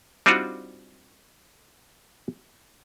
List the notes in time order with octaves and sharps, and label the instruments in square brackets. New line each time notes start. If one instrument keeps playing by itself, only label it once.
[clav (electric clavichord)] G3 C4 D4 D#4 F4 F#4